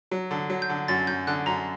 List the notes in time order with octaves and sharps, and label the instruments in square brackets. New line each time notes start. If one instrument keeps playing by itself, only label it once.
[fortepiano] F#3
D3
F#3
[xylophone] G6
[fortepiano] D3
[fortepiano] F#2 [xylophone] A6
[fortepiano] F#2 [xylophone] G6
[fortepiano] D3 [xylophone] F#6
[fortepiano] F#2 [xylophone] A#5